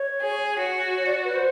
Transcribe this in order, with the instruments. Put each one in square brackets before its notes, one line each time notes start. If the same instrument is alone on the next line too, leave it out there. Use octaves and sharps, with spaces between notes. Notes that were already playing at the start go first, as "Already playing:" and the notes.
Already playing: [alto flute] C#5
[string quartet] G#4
[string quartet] F#4 [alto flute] C#5
[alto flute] C#5
D5
B4
C5